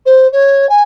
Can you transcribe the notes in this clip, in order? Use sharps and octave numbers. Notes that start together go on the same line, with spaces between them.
C5
C#5
G#5